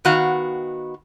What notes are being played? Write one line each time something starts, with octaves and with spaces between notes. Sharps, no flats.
D#3 B3 F#4 F5